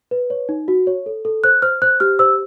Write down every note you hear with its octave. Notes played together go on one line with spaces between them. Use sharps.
B4
C#5
D#4
F#4
C#5
A4
A4
C5 F#6
C5 F6
C5 F#6
G4 F6
C5 E6